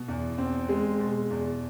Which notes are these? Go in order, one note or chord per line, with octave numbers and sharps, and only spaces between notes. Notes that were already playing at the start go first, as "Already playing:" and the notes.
Already playing: B2
E2
C4
G#3
B2
E2